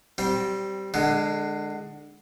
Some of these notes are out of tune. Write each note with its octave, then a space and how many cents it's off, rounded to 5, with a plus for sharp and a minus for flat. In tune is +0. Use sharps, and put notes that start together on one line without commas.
G3 -15 C4 +0
D3 +25 G#3 +0